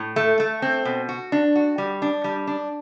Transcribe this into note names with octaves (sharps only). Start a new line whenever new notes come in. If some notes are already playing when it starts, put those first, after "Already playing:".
Already playing: A2
A3
A3
C4
B2
F#4
D4
F#4
G3
D4
G3
D4